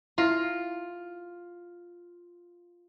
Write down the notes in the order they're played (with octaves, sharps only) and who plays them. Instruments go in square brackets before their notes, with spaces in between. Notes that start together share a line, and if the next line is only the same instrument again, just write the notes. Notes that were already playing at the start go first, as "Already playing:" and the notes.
[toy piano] E4 E5 F5 [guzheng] F4